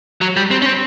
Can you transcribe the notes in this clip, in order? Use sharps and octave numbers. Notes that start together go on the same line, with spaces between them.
F#3
G3
C4
C#4
C4